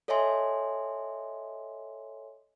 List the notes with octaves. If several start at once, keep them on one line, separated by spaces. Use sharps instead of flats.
A4 C#5 D#5 E5 G#5 C6